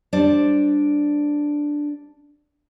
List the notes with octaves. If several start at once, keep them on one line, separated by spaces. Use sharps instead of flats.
G3 D4 C5 D5